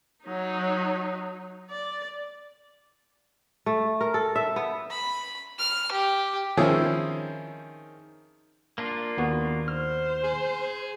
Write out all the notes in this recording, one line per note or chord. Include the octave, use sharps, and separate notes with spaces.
F#3 D#4
D5
A3
A#4
A4
E5
B3
B5
F6
G4
D#3 F3 C4 C#4 E4 G#4
A#3 D4 F4
D#2 B3 F#4
C5 F6
G#4